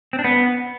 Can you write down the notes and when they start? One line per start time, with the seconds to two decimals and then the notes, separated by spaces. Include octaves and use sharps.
0.13 C4
0.19 D4
0.24 B3